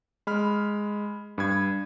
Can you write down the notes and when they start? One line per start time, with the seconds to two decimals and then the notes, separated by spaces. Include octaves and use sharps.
0.27 G#3 B5 F6
1.38 G2 B5 G#6